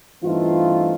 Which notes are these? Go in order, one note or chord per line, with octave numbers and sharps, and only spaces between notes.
G2 E3 A3 C4 D#4 F4